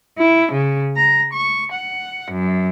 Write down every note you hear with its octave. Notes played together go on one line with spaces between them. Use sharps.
E4
C#3
A#5
C#6
F#5
F#2